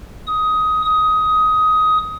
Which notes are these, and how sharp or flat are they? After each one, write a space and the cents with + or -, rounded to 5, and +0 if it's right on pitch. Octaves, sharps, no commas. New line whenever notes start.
D#6 +15
D#6 +15